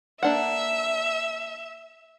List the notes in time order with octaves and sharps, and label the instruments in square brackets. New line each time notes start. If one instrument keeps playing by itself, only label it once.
[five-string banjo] A#3 D4 F#5 [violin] E5